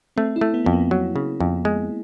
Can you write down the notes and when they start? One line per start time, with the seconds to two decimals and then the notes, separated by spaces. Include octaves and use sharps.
0.16 A3 C4
0.36 E4
0.41 A3
0.54 B3
0.65 F2 B3
0.73 A#3
0.91 F#3
1.16 C#3
1.40 F2
1.65 G#3